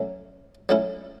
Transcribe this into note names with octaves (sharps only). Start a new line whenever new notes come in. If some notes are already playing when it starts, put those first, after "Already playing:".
Already playing: F#3 A3 C#4
F#3 A3 C#4 E4